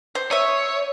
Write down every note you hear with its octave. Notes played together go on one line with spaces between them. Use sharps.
C5
C#5 E5 D#6